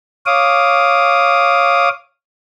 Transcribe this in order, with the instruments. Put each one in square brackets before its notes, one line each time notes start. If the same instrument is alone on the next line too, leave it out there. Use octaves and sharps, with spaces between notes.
[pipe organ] C#5 F5 D6 D#6